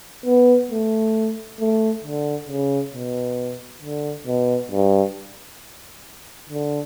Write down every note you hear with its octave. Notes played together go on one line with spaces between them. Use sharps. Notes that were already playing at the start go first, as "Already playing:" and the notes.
B3
A3
A3
D3
C#3
B2
D3
B2
G2
D3